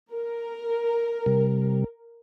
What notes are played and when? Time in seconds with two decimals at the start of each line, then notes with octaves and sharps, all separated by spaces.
0.12 A#4
1.26 C3 G3